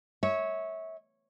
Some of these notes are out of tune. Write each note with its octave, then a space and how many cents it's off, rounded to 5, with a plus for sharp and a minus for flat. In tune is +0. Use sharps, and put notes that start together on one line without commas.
C#5 -5 E5 -30